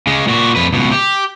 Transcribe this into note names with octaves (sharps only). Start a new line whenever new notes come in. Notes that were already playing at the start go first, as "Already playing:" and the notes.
C#3 G#3
A#2 F#4
F2 B4
C#2 B2
G4